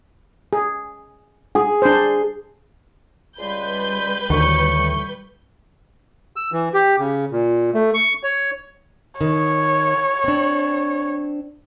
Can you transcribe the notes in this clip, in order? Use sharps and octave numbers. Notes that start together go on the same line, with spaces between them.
G#4
G#4
D4 C5
C#2 G3 B4 D5 C6 G6
D2 A2 D#3 C#6
E6
E3
G4
C#3
A#2
A3
C#6
C#5
D#3 C#5
C4 D4